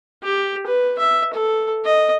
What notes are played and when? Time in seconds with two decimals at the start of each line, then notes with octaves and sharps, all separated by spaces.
0.23 G4
0.66 B4
0.99 E5
1.33 A4
1.85 D#5